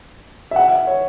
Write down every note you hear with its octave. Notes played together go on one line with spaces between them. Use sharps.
E5
F#5
E5
C#5